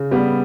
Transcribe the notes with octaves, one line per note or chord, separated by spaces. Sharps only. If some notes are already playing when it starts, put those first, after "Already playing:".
Already playing: C#3
G3 B3